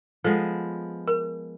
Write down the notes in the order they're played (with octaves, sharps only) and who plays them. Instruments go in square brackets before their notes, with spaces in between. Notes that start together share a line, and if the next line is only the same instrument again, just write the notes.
[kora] F3 G#3 B3 [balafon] A4
[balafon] A#4